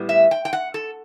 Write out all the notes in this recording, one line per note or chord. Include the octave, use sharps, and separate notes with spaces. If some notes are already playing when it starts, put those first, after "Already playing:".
Already playing: A2 G3 B3
E5
G5
G5
F#5
A4